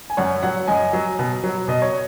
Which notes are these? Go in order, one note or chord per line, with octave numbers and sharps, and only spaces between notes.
G#5
F#2 C#5 F#5
F#3 C#5 F#5
F#2 D#5 G#5
F#3
B2
F#3
B2 D#5
C#5